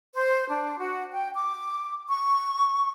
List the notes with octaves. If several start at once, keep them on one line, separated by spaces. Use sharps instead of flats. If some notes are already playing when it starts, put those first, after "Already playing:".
C5
D4
F#4
G5
D6
C#6